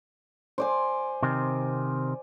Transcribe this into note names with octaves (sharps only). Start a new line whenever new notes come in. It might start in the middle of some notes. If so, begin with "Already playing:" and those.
C5 D5 G#5
C3 D#3 C4